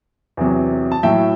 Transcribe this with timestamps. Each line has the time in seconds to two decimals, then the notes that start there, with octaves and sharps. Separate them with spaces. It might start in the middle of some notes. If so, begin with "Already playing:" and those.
0.37 E2 C3 F#3
0.92 A5
1.03 A2 F#3 E5 G5